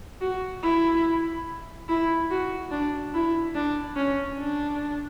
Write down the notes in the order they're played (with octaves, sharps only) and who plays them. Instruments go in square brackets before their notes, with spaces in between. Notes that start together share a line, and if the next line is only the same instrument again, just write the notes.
[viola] F#4
E4
E4
F#4
D4
E4
D4
C#4
D4